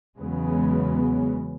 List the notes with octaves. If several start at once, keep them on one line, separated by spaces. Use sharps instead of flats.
E2 C#3 F#3 G#3 B3